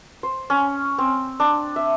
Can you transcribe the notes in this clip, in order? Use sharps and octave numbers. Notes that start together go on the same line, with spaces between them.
C5
C#4
C4
D4
E5